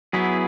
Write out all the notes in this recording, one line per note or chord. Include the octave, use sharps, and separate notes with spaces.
F#3 B3 E4 G#4